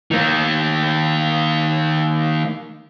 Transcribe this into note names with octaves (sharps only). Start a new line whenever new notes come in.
D#3 A#3